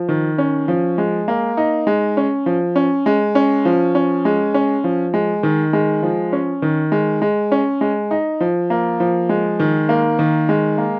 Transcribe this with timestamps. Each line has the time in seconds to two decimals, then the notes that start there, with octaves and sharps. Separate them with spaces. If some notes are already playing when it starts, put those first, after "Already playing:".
Already playing: F3
0.09 D#3
0.38 C#4
0.68 F3
0.98 G#3
1.28 A#3
1.57 D#4
1.87 G#3
2.17 C#4
2.46 F3
2.76 C#4
3.06 G#3
3.35 C#4
3.65 F3
3.95 C#4
4.25 G#3
4.54 C#4
4.84 F3
5.14 G#3
5.43 D#3
5.73 G#3
6.03 F3
6.33 C#4
6.62 D#3
6.92 G#3
7.22 G#3
7.52 C#4
7.81 G#3
8.11 D#4
8.40 F3
8.70 A#3
9.00 F3
9.29 G#3
9.60 D#3
9.89 A#3
10.19 D#3
10.49 G#3
10.78 A#3